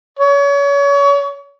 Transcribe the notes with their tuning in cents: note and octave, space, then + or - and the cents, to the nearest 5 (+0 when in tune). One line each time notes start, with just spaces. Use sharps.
C#5 +30